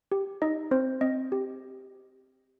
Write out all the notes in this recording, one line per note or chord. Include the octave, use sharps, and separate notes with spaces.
G4
D#4 D#5
C4 C5
C4 D#5
G4